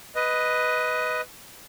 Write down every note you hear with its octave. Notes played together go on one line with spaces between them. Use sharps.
B4 D#5